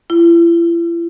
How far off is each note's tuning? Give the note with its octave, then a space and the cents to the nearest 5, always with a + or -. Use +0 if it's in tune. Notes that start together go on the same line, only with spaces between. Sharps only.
E4 +45